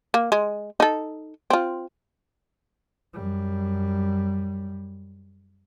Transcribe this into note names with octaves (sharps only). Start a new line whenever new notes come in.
A#3
G#3
D#4 A4
C4 F4
F#2 G3